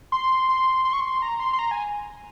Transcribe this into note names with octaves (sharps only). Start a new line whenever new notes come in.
C6
C6
C6
C#6
C6
A#5
C6
C6
A#5
G#5